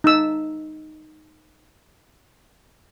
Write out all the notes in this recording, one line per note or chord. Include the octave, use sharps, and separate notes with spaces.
D#4 E6